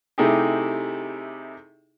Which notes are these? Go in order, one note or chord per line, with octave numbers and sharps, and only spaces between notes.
C3 A3 D#4 E4 G4 G#4